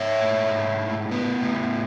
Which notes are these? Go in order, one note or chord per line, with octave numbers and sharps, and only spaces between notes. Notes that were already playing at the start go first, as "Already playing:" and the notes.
Already playing: G#2 C#5 E5
A3
G#2
A2
B3
A2